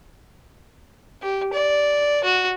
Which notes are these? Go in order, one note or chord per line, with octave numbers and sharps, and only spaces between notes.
G4
D5
F#4